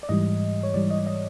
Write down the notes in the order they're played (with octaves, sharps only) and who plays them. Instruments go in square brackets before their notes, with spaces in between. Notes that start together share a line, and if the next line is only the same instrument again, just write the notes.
[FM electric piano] D5
G#2 E3 G3 D#5
C#5
G#2 E3 G3 D5
D#5
D#5